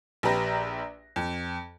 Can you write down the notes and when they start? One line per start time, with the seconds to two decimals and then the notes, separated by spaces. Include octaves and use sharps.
0.23 A#1 G4 B4 A#5 A#6
1.16 F2